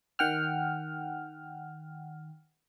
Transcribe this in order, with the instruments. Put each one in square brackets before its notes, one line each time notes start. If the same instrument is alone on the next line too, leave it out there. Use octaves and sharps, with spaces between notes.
[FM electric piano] D#3 F#5 G5 F6